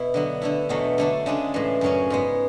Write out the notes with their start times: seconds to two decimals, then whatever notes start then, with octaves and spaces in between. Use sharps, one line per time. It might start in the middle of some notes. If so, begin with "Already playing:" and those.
Already playing: B2 E4
0.14 D3 F#3 B3
0.42 D3 A3 E4
0.69 E2 B2 F#3 A3
0.98 D3 A3 D4
1.26 C#3 G#3 D4
1.54 A2 E3 G#3
1.81 F#2 C#3 F#3 C#4
2.10 G#2 G#3 B3